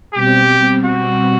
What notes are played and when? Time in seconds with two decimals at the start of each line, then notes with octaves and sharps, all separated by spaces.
0.14 B2 G3 C4 G4
0.85 F#4